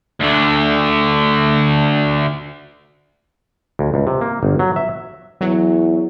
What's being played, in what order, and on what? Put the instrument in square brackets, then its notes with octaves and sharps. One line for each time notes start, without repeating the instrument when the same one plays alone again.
[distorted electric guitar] D2 D3
[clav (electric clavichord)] D2
C#2
C3
A#3
G1
F#3
E5
[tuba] E2 [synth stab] F#3